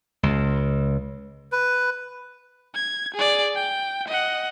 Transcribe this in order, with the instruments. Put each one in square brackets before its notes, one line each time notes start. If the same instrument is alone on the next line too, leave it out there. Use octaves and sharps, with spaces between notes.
[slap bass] C#2
[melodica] B4
[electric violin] G#6
G#4 D5
G5
D#5 F#5